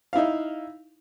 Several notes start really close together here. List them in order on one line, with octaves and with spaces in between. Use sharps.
F5 E4 D#4